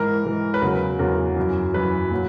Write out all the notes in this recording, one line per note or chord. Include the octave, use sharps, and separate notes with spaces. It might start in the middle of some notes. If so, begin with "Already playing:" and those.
Already playing: G#2 E3 A#4
G#2 E3
B4
E2 C#3 F#3 A#4
E2 C#3 F#3 A#4
F#2 E3
F#2 E3 B4
A#2 F#3